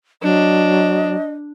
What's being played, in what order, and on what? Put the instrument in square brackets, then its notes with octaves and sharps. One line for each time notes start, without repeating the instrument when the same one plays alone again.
[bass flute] F#3 [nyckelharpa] D4 [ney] D#5